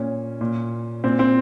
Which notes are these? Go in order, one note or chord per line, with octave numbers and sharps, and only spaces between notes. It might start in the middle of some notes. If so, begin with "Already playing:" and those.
Already playing: A#2 C#4
A#2
A#2 C4
C4